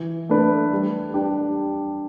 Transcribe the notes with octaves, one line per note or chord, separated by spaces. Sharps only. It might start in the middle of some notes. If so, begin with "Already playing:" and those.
Already playing: E3
A3 D4 B4 D5
G3
D4 G4